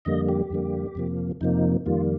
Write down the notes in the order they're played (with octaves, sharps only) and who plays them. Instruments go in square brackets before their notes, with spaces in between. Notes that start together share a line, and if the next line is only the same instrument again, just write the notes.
[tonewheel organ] F2 D3 G3 A#3 D#5
G4
F2 D3 G3 A#3
F2 C3 F3 A#3
F2 C3 F3 A#3 D#4
F2 D#3 G3 A#3 F4